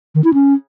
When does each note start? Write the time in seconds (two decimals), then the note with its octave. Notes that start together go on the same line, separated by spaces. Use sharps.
0.15 D#3
0.24 E4
0.34 C#4